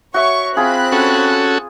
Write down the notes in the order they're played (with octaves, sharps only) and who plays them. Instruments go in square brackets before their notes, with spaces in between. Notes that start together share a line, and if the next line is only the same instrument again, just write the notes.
[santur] F#4 E5 [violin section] C#5 C#6
[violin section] C4 B5 F#6 [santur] F4 G#4
[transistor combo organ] C#4 F#4 A4